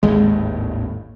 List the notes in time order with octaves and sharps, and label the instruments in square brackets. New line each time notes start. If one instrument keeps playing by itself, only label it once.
[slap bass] G#1 D#2 A2 [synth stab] G#3